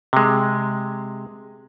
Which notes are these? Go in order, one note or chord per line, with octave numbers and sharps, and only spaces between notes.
C3 G#3